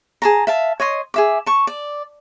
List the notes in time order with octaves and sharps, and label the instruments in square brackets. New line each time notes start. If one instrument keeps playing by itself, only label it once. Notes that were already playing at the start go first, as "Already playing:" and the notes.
[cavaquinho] G#4 A5 A#5
E5 F5 A5
C#5 D#5 C6
G#4 E5 D6
A5 C#6
D5